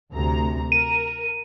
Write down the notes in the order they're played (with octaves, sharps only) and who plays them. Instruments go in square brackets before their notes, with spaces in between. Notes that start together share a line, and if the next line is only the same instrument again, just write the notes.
[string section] D2 C3 A#5
[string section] A#4 [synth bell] D#7